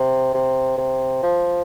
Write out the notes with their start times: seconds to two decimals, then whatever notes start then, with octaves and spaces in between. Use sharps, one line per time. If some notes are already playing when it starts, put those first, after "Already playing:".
Already playing: C3
0.34 C3
0.78 C3
1.23 F3